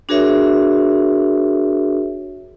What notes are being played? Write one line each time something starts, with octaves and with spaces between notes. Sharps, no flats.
D4 F#4 G#4 A#4 C#5 E5